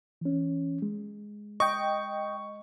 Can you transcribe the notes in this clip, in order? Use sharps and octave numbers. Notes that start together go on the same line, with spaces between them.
E3 C#4
G#3
D#5 G5 C#6